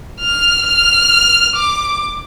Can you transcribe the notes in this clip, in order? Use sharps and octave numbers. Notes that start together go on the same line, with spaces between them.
F6
F6
D6